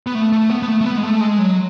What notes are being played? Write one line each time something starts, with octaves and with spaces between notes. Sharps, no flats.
B3
A3
A3
B3
B3
A3
A3
B3
G#3
A3
G#3
F#3